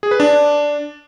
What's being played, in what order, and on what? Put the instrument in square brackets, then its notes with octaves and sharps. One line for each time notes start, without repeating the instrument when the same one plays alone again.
[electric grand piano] G#4
B4
D4